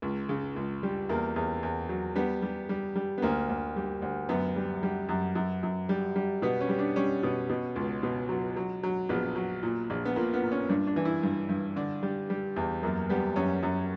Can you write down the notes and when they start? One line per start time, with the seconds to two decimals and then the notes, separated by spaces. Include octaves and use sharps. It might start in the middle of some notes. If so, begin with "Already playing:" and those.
0.02 C#2
0.29 C#3
0.56 C#2
0.83 G3
1.09 E2 A#3
1.36 E2
1.63 E2
1.89 F#3
2.16 G3 B3
2.42 G3
2.69 G3
2.96 G3
3.18 B3
3.22 D2 A#3
3.49 D2
3.76 G3
4.02 D2
4.29 F#2 B3
4.56 G3
4.83 G3
5.09 F#2
5.35 F#2
5.63 F#2
5.89 G3
6.16 G3
6.42 B2 B3
6.61 C#4
6.69 G3
6.79 D4
6.96 G3 C#4
7.23 B2
7.49 B2
7.76 C#2
8.03 B2
8.29 F#3
8.56 F#3
8.83 F#3
9.09 A#1 B3
9.36 F#3
9.63 A#2
9.90 A#1
10.05 B3
10.16 A#2 A#3
10.34 B3
10.43 A#2
10.52 C#4
10.69 G2 D4
10.87 D4
10.96 E3
11.05 E4
11.23 G2
11.49 G2
11.76 D3 D4
12.03 G3
12.30 G3
12.56 E2
12.83 F#2 A#3
13.09 G3 B3
13.36 F#2 C#4
13.63 F#2